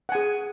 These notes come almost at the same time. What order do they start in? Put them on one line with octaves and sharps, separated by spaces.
F#5 G#5 G#4